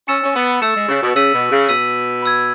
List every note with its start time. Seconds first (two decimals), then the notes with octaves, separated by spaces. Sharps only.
0.08 C#4 E6 A6 C#7 E7
0.23 C#4
0.36 B3
0.62 A3 E6 A6 C#7 E7
0.76 G#3
0.89 C#3
1.02 B2
1.16 C#3 E6 B6 D#7 F#7
1.34 B2
1.51 C#3
1.69 B2 E6 B6 D#7 F#7
2.22 B5 E6 G#6